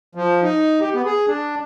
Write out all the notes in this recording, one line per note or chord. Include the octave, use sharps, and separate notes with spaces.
F3
D#4
G4
B3
G#4
D4